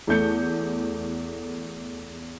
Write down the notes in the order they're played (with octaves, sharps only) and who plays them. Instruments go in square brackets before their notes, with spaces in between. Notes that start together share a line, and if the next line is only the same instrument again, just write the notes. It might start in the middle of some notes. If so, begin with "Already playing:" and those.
[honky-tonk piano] E2 A3 G6 C#7